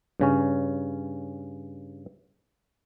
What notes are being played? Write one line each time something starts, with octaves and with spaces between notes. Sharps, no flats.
G2 C#3 C#4